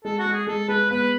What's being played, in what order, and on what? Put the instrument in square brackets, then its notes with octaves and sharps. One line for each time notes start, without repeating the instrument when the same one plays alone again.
[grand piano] G#3 [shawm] A4
[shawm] F#4
[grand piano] G#3
[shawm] G#4
[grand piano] G#3 [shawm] A4
[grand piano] G#3 [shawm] B4
[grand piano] B3 [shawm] B4